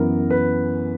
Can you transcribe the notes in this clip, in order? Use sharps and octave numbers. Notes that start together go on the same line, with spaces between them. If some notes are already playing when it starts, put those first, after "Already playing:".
Already playing: F#2 E3 B3 A#4
B4